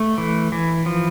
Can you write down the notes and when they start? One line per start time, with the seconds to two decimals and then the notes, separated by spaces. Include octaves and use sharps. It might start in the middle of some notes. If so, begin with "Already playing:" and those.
Already playing: A3
0.18 E3
0.52 E3
0.86 F3